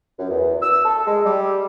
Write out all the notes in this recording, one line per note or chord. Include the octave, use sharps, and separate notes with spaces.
F#2
E2
E6
A4
G#3
G3